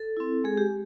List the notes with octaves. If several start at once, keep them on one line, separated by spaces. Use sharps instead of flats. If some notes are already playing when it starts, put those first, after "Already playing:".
Already playing: A4
C4 E4
G#3 G#4
G4